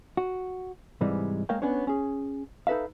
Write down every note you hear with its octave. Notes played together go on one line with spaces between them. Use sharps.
F#4
G#2 C3 E3 G3 G#3
G#3 A#3 A#4 C#5 F5 G5
B3 C#4 D4 C#5
C#4 G#4
D#4 A4 B4 E5 F5